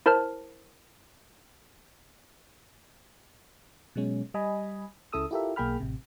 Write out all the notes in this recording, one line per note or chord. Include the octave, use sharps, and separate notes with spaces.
E4 A#4 C5 A5 F6
B2 F#3 G#3 C#4
G3 D#5 G#5 B5
C#2 C#3 E4 A4 D#6 E6
E4 F4 G4 A4 A#4 E5
B1 A#3 G#4 G5 B5 F6
A1 C3